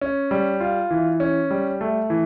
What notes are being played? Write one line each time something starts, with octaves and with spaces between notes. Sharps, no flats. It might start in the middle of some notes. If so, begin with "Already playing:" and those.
C#4
G3
F4
E3
C#4
G3
A3
E3